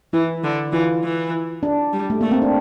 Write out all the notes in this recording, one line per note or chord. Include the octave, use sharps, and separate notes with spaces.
E3 E4
D3
E3 F4
E3
D4
G3
A3
A3 A#3
C4
D4